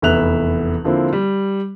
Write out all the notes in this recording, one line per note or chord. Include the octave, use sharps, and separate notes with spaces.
F1 E2 B3 E5 F#6 F7
D3 F3 A#3 C4 E4
G3